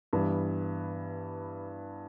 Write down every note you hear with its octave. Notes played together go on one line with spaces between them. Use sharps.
G2 E3 B3